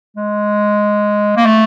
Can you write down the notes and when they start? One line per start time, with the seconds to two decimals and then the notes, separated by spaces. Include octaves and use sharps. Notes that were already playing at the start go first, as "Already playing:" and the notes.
0.17 G#3
1.37 A#3
1.46 A3